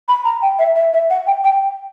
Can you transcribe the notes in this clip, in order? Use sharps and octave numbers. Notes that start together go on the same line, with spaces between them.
B5
A#5
G5
E5
E5
E5
F#5
G5
G5